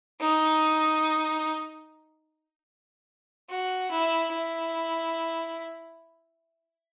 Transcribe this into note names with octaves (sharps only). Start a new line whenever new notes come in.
D#4
F#4
E4
E4